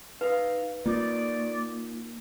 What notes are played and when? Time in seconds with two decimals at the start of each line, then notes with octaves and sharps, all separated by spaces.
0.21 D#4 B4 F5
0.86 A#3 D#4 F4 D5